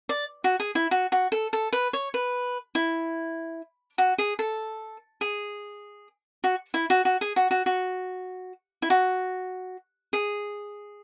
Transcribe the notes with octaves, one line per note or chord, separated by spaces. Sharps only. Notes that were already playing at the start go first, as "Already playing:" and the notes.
D5
F#4
G#4
E4
F#4
F#4
A4
A4
B4
C#5
B4
E4
F#4
G#4
A4
G#4
F#4
E4
F#4
F#4
G#4
F#4
F#4
F#4
E4
F#4
G#4